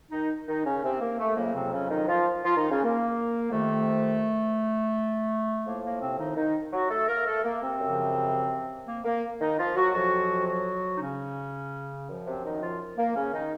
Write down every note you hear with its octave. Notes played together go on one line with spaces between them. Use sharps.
D#3 D#4
D#3 D#4
C#3 C#4
C3 C4
A#3
A3
F2 C#3 F#3 A#3
C3 C4
C#3 C#4
D#3 D#4
F3 F4
F3 F4
D#3 D#4
C#3 C#4
A#3
F2 C3 D#3 A3
A2 F3 A#3
A#3
C3 C4
D#3 D#4
D#3 D#4
F#3 F#4
A3 A4
A#3 A#4
A3 A4
A#3
C3 C4
F#2 C#3 F3
A#3
A#3
D#3 D#4
F3 F4
F#3 F#4
F2 C3 F3 F#3 F#4
F#3 F#4
D#4
C#3 C#4
F#2 F3
C3 C4
D#3 D#4
F3 F4
A#3
C#3 C#4
D#3 D#4